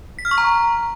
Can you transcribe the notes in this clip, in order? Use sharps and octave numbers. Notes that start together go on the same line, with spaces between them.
B6
F6
C#6
A#5